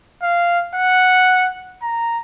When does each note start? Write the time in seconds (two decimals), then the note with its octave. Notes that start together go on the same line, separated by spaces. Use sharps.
0.22 F5
0.75 F#5
1.83 A#5